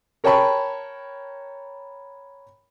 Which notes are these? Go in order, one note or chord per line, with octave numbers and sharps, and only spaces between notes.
A#4 C#5 G5 A5 B5 C#6